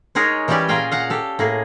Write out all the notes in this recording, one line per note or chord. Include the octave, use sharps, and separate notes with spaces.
G#3 D#4 G#4 A#4 C#5
E3 G3 C#4 G4 D5 G#5
A#2 F4 G#4 A#4 F5 G5
F5 F#5 A#5
G4 A4
A2 A#3 G#4